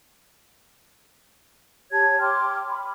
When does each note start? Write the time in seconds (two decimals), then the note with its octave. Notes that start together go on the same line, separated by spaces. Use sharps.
1.91 G4 C#5 A5 G#6
2.20 G5 C6 D6 F6
2.69 B5